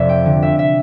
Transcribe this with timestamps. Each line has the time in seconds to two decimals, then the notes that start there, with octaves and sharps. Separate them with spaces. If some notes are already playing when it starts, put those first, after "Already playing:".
Already playing: F1 F2 D5 E5
0.09 G5
0.26 D3
0.42 E5
0.59 E5